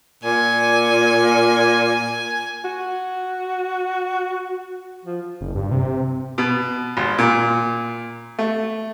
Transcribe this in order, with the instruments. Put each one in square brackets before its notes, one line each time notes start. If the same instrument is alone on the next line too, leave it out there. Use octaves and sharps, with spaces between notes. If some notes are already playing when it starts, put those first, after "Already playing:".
[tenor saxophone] A#2 [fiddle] G#5
[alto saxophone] F#4
F3
[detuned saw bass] F#1
G2
C3
[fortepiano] B2
G#1
A#2
A3